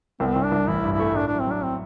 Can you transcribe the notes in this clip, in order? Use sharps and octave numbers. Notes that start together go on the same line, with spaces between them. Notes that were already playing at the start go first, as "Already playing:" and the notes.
C2 C4
B3
C2 C4
D4
C2
A1 E4
G2
E4
A3
A2 D4
F#3 D4
C4
F#3 D4
C4